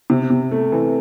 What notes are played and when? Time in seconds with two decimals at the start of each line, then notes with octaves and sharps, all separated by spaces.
0.10 C3
0.30 C3
0.51 A3
0.72 E3